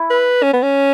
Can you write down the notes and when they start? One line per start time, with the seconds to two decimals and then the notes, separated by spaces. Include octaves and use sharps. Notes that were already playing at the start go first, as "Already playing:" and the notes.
Already playing: E4
0.10 B4
0.43 C#4
0.53 B3
0.63 C#4